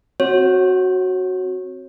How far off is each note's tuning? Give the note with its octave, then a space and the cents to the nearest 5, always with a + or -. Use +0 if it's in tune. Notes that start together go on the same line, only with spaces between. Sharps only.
C4 +5 F#4 +0 C#5 -25